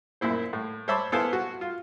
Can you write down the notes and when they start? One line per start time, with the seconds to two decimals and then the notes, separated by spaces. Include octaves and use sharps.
0.21 F#2 A#2 E4 C5
0.53 A2
0.88 C5 C#5 E5 A5 B5 D6
1.12 B3 E4 A4 C5 F5 G#5
1.33 F#4
1.61 F4